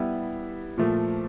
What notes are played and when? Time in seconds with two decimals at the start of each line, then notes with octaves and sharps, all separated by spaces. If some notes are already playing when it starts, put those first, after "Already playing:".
Already playing: G3 B3 E4
0.78 A#2 F3 A3